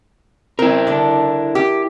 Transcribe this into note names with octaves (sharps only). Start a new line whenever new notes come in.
C4 E4 A#4
D3 D4
G4